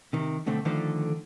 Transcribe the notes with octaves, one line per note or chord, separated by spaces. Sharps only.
C3 D#3
B1 D3 A3 C4
D3 D#3 F3 A3 A4 C5